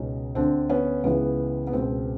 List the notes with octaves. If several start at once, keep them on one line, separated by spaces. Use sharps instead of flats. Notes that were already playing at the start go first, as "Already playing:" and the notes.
Already playing: C#2 B2 C#4 D#4
D2 D3 C4 D4
B3 C#4
C#2 C#3 E3 B3
B3
C#2 B2 C4